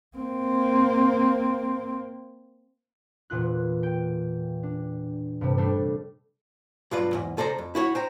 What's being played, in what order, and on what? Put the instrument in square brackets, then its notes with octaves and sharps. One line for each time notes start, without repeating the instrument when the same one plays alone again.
[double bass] A#3 C4
[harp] E1 A#2 F4 F#6
G5
D4
G2 C3 G3 A3
G3 A3 D4 A4
[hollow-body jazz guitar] B1 G2 F4 B4 D5
E2 G#2
C#2 A4 C5 D5 A#5
F2
E4 F#4 C#5
C5 G5 A#5